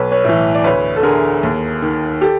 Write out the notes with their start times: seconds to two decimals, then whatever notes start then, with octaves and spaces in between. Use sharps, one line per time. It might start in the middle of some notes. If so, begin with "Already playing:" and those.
Already playing: B1 B4 C#5
0.11 B4 C#5
0.24 A2 E3
0.54 D5
0.64 D2 B4 C#5
0.96 A4
1.03 D3 G#4 A#4
1.43 D#2
1.82 D#3
2.21 G4 A4